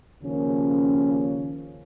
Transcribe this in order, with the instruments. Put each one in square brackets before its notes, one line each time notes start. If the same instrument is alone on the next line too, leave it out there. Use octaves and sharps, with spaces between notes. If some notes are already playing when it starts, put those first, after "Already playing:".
[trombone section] D#2 C#3 F3 A#3 C#4